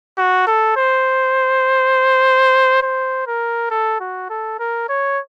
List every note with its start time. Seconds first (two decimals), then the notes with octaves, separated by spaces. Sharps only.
0.18 F#4
0.47 A4
0.77 C5
2.82 C5
3.27 A#4
3.71 A4
4.00 F#4
4.30 A4
4.60 A#4
4.89 C#5